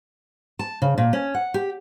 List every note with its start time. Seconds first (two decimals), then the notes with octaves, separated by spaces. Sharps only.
0.59 A5
0.82 C#3
0.98 A#2
1.13 C#4
1.35 F#5
1.54 G4